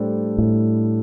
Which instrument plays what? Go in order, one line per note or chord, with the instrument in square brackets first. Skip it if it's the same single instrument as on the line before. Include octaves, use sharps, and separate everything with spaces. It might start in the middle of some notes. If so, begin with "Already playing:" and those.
Already playing: [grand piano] A2 G3 D4 A4 C5
[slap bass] A2